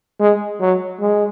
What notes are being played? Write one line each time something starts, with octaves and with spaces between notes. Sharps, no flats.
G#3
F#3
G#3